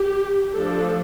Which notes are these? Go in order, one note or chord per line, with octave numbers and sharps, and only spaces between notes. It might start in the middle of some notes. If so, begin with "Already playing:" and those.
Already playing: G4
F3 A3 D4 A4